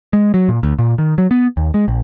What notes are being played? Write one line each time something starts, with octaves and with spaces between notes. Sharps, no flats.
G#3
F#3
A#2
D2
A#2
D#3
F#3
B3
D#2
G#3
A#1